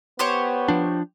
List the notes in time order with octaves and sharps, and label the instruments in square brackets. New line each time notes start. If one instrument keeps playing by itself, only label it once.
[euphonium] B3 [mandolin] G4 C5 C#5
[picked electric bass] F3 D4